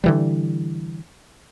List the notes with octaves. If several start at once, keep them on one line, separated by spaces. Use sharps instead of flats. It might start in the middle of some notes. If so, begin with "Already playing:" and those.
D3 E3 G3